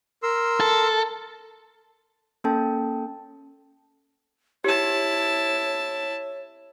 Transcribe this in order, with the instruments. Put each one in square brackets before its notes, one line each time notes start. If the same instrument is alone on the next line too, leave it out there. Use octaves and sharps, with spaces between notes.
[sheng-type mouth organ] A#4 C6 E6
[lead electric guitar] A4
[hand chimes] A#3 C#4 A4 G5 A5
[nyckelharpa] E4 A5 [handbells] G4 [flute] C#5